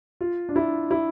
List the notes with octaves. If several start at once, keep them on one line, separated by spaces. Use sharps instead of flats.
F4
D4
E4
E4